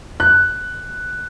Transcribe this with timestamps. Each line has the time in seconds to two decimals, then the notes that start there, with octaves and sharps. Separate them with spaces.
0.20 F#6